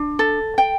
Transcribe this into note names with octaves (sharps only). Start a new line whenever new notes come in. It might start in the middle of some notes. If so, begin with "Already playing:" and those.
Already playing: D4
A4
G5